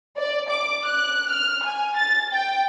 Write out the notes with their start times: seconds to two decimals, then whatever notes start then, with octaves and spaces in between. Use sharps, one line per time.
0.17 D5
0.51 D6
0.85 F#6
1.30 F6
1.64 G#5
1.96 A6
2.33 G5